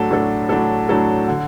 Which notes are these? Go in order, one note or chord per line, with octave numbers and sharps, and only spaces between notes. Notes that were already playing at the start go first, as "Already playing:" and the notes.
Already playing: A2 F#3 D4 A4
A2 F#3 D4 A4
A2 F#3 D4 A4
A2 F#3 D4 A4
D3